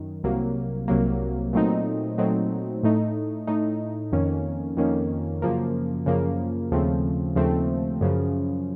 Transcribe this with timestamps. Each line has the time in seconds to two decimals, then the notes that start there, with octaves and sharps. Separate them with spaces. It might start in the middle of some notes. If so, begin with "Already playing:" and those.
Already playing: F#2 D#3
0.23 C2 C3 F#3 A#3
0.88 C2 C3 F#3 A#3
1.53 A#2 F#3 A3 C4 D#4
2.18 A#2 F#3 A3 C4 D#4
2.83 A2 A3 D#4
3.47 A2 A3 D#4
4.12 F2 D#3 A#3 C#4
4.77 F2 D#3 A#3 C#4
5.42 F#2 C#3 F3 A#3
6.06 F#2 C#3 F3 A#3
6.72 D#2 C#3 F3 A3 C4
7.36 D#2 C#3 F3 A3 C4
8.01 F#2 C#3 F3